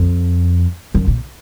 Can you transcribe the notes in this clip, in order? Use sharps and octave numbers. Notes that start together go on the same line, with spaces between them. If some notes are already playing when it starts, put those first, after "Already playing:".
Already playing: F2
F#2
A#2